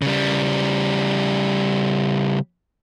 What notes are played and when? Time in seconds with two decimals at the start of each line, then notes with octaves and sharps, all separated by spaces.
0.02 C#3 G3